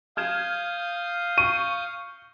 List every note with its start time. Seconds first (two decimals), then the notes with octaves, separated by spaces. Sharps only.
0.17 F5 D#6 F6 G6 G#6 E7
1.38 C#6 D#7